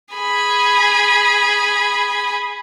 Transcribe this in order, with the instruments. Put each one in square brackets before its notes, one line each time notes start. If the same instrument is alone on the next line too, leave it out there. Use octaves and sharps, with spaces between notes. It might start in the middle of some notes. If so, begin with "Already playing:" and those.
[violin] G#4 B5